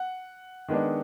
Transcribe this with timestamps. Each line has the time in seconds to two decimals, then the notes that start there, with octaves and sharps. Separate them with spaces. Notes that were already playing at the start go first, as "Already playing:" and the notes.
Already playing: F#5
0.68 D#3 G#3 B3 D4